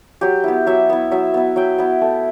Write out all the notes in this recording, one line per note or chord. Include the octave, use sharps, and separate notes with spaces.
F#3 G4
B3 E4
F#3 E5
B3 E4
F#3 E5
B3 E4
F#3 G5
B3 E4
A3